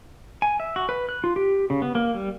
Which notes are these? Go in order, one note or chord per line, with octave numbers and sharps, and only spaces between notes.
G#5
E5
F#4
B4
F#6
F4
G4
C#3
B3
A#3
G3